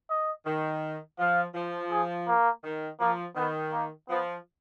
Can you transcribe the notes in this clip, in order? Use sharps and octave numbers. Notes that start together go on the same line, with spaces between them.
D#5
D#3
F3 F5
F3
G#4
A#3
D#3
F3 A#3
D#3 B3
A#3
F3 B3